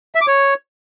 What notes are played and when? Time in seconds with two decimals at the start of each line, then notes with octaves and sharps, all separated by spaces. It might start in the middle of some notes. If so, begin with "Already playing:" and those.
0.15 E5
0.21 D6
0.27 C#5